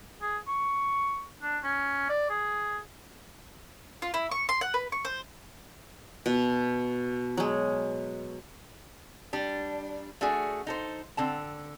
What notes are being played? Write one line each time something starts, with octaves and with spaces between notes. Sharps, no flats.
G#4
C#6
D4
C#4
D5
G#4
F4
E4
C#6
C6
F#5
B4
C#6
C5
B2
F#3 G#3
G3 D4
A3 D4 F#4 G#4
D#4 A4 C5
D3 C4 A5